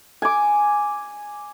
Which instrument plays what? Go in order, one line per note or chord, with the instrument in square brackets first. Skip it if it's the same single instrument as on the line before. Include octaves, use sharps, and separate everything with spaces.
[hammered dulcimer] G#5 D6